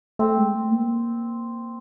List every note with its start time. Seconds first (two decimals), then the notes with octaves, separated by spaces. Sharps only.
0.19 A3 C4
0.37 G#3
0.55 A3
0.70 A#3